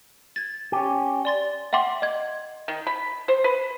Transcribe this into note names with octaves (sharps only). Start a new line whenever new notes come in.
G#6 A6
C#4 G4
D5 C6 A6
E5 F#5 G5 C6 D6
D#5 G#6
D#3
B5
C5
B4